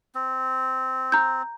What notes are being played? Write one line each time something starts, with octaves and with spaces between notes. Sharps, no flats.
C4
A#5 G6